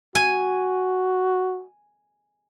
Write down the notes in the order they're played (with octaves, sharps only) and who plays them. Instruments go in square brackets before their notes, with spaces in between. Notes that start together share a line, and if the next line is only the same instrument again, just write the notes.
[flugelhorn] F#4 [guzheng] G#5